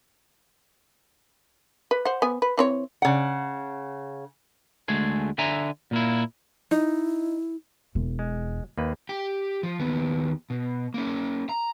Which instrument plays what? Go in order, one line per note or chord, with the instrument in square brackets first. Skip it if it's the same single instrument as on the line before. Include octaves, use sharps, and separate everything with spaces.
[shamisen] B4
C5 F#5
B3 G#5
B4
E3 C4 C#5
[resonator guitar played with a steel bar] C#3 F#5
[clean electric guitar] D2 G#3 A3 G#4
D3 E5 G#5 A#5
A#2 A#3 E4
[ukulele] D#4 [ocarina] E4
[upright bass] E1
[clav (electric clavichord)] G#3
D#2 A#3 B4
[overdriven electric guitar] G4 G5
F3
D#2 B3
B2
A#3 C#4
A#5